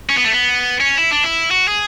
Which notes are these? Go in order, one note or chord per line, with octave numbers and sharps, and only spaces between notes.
C#4
B3
A3
B3
C#4
E4
D4
E4
F#4
G#4